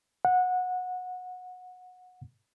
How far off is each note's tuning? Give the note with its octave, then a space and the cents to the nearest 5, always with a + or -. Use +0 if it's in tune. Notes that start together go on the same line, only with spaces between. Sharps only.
F#5 -20